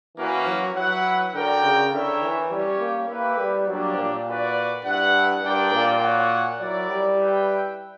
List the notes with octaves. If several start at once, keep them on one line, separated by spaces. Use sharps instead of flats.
E3 A#3 C#4 F#4 B4
F#3
F#3 E4 B4 F#5
D3 F#4 A#4 D5 G5
C#3
D3 E4 A#4 C#5 E5 G5
E3
G3 C#4 G4 C#5
A#3
A#3 E4 G4 B4
G3
F#3 G3 A#3 D4 G4
A#2
F#4 B4 D5
G2 E4 B4 F#5
G2 D4 A#4 D5 G5
A#2
F#4 C#5 F#5
F#3 E4 A#4 D5
G3
E4 B4 E5 G5